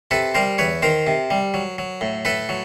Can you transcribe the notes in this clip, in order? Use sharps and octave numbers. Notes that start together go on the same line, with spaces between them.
C3 A4 B4
G3 A#4 C5
E2 B4 C#5
D#3 A#4 C5
C3
G3
F#3
F#3
A2
A2 A4 B4
F#3